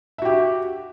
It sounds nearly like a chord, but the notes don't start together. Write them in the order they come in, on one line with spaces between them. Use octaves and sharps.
E5 F#4 G4